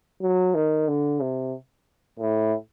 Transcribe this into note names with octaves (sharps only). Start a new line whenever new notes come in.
F#3
D#3
D3
C3
A2